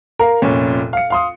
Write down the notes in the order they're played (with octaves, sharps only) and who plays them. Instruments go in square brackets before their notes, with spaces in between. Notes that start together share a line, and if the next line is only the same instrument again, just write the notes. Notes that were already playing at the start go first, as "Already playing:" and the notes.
[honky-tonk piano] A#4 F5
F1 A#2 C#4
F5 C#7
F5 C6 D#6